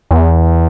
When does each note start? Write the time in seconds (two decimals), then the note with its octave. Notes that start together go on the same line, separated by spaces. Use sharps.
0.11 E2